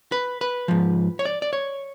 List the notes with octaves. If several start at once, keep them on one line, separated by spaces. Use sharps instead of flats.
B4
B4
G#2 F3
C#5
D5
D5
C#5